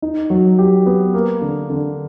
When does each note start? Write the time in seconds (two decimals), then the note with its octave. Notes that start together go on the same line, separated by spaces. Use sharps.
0.02 D#4
0.30 F#3
0.59 G4
0.86 B3
1.14 A#3
1.42 D3
1.70 D3